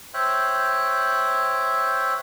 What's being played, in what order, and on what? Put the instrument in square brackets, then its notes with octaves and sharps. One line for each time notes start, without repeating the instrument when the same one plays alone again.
[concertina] C5 C#5 E5 G5 F#6